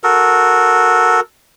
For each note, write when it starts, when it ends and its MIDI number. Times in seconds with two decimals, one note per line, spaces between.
0.04 1.20 66
0.04 1.20 69
0.04 1.20 70